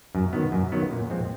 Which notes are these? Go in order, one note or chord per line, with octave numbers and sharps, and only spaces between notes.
F#2
D#3 F#3 B3
F#2
D#3 F#3 B3
A#2
F3 G#3 C4